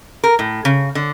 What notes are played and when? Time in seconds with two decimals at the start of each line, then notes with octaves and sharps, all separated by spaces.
0.24 A#4
0.39 A2
0.65 C#3
0.95 D3